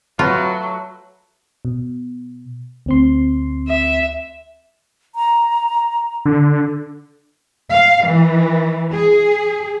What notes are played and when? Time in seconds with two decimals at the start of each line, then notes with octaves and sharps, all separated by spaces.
0.19 F#3 A3 F4 F#4 B4
1.65 B2
2.86 D2 C4 C6
3.68 E5
5.15 A#5
6.25 D3
7.71 F5
8.06 E3
8.93 G#4